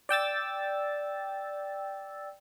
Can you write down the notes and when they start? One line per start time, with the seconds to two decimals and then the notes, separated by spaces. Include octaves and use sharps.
0.09 D5 G5 E6 A6